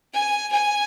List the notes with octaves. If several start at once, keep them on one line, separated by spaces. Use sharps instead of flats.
G#5
G#5